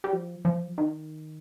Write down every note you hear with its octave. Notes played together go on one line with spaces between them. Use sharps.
G3
F3
F3
D#3